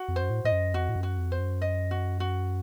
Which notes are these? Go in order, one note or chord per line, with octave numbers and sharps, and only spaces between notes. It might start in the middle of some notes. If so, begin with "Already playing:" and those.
Already playing: F#4
F2
C5
F#2
A2
A2 D#5
F#2
F2 F#4
A2
F#2
F#4
F2
C5
F#2
D#5
F#4
F#4